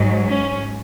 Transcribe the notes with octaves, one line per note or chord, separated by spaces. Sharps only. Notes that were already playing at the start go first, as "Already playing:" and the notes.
Already playing: G#2 F#3
C#4